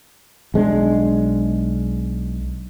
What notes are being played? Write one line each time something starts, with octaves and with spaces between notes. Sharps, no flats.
B1 G#3 C4 D4